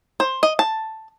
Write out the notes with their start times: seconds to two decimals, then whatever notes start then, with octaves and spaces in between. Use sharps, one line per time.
0.20 C5
0.43 D#5
0.59 A5